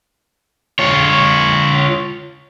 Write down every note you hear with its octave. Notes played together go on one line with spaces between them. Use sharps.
F4 C#5